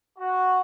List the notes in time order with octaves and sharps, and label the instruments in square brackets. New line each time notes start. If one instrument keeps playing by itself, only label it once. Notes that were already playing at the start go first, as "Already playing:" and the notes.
[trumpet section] F#4